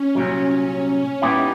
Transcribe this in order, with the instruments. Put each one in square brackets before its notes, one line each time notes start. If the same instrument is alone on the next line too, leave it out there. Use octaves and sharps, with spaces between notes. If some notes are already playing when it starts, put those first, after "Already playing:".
Already playing: [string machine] C#4
[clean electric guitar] C2 A#2 F#3
[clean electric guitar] A#2 G3 B3 E4 G4 [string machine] D#4